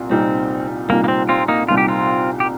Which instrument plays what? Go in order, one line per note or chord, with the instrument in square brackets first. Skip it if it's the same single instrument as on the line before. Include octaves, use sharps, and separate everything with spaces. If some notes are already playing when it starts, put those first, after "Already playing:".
Already playing: [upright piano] C2 A#2
[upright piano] C2 A#2 G3 D#4 [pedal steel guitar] C4
[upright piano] C2 A#2 G3 D#4 [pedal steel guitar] A#3
[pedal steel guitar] A#3
C4
C4 F4
A#3 D#4
[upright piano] C2 A#2 G3 D#4 [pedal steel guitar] F4
[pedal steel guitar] G4
C4 F4
G4